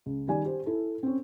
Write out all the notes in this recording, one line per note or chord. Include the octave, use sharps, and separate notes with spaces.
C#2
D#3 G3 D5 G#5
G4 C5
E4 A4
C4 C#4